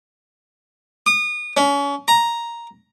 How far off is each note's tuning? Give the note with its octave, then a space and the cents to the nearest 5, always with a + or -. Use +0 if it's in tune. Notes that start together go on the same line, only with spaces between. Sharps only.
D#6 -30
C#4 +30
A#5 +5